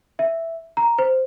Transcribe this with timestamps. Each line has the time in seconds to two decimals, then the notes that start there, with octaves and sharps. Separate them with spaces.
0.19 E5
0.77 A#5
0.98 C5